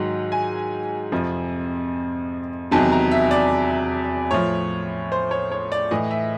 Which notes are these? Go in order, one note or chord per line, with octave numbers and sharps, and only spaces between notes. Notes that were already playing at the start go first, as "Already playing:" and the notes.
Already playing: G#2 D#3 F#3
G#5
F2 C3 F3
E2 C3 D#3 F#3 A5
A#5
E5
D5
A2 F3 C#5
C5
C#5
C#5
D5
A2 E3 D#5
E5